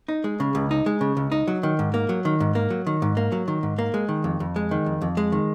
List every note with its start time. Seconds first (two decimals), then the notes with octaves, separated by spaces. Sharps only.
0.08 D#4
0.24 G#3
0.40 C#3
0.55 C#2
0.71 D#4
0.86 G#3
1.01 C#3
1.17 C#2
1.32 D#4
1.48 F#3
1.63 D#3
1.79 G#2
1.94 A#3
2.09 F#3
2.25 D#3
2.40 G#2
2.55 A#3
2.70 F#3
2.87 D#3
3.02 G#2
3.17 A#3
3.32 F#3
3.48 D#3
3.63 G#2
3.79 A#3
3.94 G#3
4.09 D#3
4.24 F2
4.40 F2
4.56 G#3
4.71 D#3
4.86 F2
5.01 F2
5.17 G#3
5.32 D#3